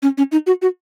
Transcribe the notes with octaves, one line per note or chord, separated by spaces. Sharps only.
C#4
C#4
D#4
F#4
F#4